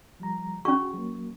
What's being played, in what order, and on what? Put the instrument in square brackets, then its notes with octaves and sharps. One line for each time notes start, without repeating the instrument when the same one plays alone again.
[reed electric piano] F3 G3 A#5
[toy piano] C#4 C#6 [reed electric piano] F#4 G#4
[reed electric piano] F#3 A#3